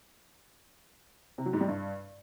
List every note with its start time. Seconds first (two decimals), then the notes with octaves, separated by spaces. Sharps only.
1.38 C3
1.46 F#3
1.53 G#2
1.61 G3
1.68 G2